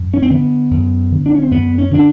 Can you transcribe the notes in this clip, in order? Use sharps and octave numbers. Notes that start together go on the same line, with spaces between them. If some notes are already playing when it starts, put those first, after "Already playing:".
Already playing: F#2
C#4
C4
D3 B3
F#2
D3
D4
C#4
C4
F#2 B3
C#4
D3 D4